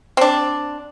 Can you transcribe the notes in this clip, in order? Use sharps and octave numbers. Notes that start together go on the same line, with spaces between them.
C4 D4